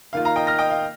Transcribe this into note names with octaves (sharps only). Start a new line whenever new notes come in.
D#3 A#3 F4 F5
F5 A#5
D#5 G5
F6 A#6
D#5 G5
F5